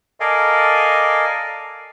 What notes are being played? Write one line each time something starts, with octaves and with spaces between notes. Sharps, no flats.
A4 A#4 D5 D#5 F5 G#5